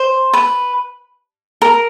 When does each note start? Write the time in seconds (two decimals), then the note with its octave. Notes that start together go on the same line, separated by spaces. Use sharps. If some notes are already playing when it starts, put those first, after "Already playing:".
Already playing: C5
0.33 B4
1.62 A#4